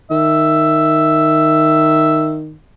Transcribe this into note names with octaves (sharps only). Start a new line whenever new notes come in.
D#3 E5